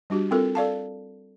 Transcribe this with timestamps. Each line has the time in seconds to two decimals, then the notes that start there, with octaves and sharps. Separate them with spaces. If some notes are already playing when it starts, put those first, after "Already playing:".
0.10 G3 D4 F#4 G4
0.31 C4 F4 A4 A#4
0.55 A4 D5 F5 A5